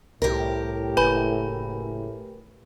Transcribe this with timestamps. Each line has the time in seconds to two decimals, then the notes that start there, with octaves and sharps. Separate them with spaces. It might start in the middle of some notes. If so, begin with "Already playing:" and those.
0.22 C2 A2 G4 A#4
0.97 F#1 B4 G#5 B5